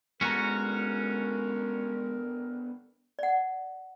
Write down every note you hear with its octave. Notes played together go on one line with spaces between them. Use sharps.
G#3 B3 C#4 D4 F#4 A4 A#4 A#5
D5 F#5